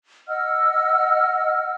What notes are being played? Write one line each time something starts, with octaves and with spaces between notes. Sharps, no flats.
D#5 F#5 E6 F6